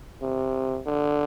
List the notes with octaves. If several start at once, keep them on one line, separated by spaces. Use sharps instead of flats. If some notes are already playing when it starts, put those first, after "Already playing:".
C3
D3